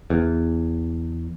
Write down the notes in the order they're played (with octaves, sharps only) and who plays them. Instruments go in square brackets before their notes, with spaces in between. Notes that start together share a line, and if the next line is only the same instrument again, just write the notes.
[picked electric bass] E2